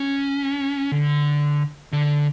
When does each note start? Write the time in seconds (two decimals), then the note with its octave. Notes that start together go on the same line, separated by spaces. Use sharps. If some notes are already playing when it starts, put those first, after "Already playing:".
Already playing: C#4
0.92 D3
1.93 D3